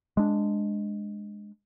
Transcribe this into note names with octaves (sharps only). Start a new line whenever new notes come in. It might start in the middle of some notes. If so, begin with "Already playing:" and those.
G#3 D4